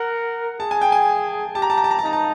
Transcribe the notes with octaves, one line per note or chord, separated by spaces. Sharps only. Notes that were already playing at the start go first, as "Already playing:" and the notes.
Already playing: A#4 F#5
G#4 A5
G#5
G5
G#5
G4 A5
A#5
A5
A#5
A5
A#5
A5
D#4 A#5
A5